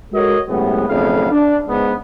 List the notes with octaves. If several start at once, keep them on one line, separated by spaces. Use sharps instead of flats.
G#3 F#4 A4 A#4 C#5 D#5
F#2 A2 C3 G#3 B3
B1 F2 C#3 A3 B3 F5
D4
C#2 G#2 B3